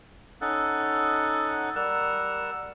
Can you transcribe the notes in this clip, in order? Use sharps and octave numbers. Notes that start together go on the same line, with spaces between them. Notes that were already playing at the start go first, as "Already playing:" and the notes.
C#4 D#4 A4 F#5
G3 A#4 F#5 E6